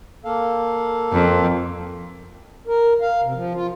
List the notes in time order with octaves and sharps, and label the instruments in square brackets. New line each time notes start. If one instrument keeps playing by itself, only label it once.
[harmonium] A#3 A4 F5
[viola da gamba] F2
[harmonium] A#4
F5
C3
F3
F4